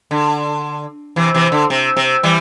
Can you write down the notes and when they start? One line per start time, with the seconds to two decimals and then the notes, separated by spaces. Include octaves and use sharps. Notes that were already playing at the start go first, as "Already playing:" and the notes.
0.11 D3
1.16 C3 E3
1.34 C3 E3
1.52 D3
1.70 C3
1.97 C3
2.23 E3 G3